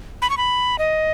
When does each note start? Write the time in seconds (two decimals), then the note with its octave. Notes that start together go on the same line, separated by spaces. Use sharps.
0.22 B5
0.30 C#6
0.37 B5
0.79 D#5